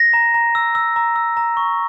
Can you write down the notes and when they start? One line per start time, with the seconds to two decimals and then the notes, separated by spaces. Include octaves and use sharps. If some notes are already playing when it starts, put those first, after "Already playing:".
Already playing: A#6
0.13 A#5
0.34 A#5
0.55 E6
0.75 E6
0.96 A#5
1.16 E6
1.37 A#5
1.57 C#6